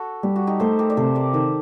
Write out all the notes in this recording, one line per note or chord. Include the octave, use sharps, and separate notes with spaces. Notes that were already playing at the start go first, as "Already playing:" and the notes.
Already playing: F#4 A4
G3 G4
F#4
D#4 G4
A3 A4 C5
G4 A#4
D5
C3 A4 C5
A#4 D5
D#3 A4 C5